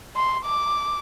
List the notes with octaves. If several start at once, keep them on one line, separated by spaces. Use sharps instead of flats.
C6
D6